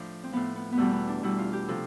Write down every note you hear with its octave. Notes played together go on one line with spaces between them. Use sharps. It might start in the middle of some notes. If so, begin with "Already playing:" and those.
Already playing: A2 F3 D4
C4
A2 F3 B3
B3
B3
E2 B2 G3 A3
B3
D4
E2 B2 G3 E4
F4
G4
C3 F3 A4